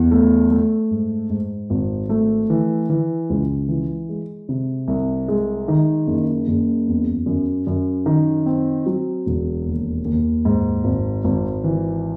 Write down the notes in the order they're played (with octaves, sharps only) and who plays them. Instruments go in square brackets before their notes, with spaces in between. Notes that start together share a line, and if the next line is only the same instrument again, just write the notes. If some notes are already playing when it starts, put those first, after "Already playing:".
Already playing: [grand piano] E2
A3
A3
G#2
G#2
G#1
A3
E3
E3
C#2
E3
G#3
C3
C2
G#3
D#3
F#1
F#1
E2
F#2
F#2
D#3
C4
F#3
E1
D#2
D#2
G#2
G#1
G#1
E3